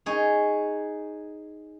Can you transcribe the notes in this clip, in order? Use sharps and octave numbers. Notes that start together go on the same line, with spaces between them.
D#4 G#4 C#5